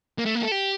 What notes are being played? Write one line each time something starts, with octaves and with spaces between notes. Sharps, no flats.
A#3
A3
A#3
A4
G4